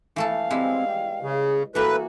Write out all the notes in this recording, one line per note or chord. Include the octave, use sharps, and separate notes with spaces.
E3 A3 A4 F5
G3 G#3 C4 E4
G5
C#3 G#4
E3 A#3 F#4 A4 B4